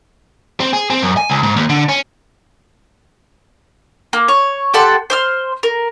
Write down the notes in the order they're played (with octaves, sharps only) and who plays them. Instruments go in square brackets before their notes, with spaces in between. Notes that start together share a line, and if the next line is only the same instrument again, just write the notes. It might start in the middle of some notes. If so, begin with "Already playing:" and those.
[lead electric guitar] C4
G#4
C4
F#2
G#5
C#2
G#2
D#2
D3
C#4
[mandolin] A#3
C#5
G4 A4 F#5 C6
C5 C6 F6
A#4